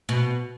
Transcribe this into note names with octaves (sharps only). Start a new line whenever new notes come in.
B2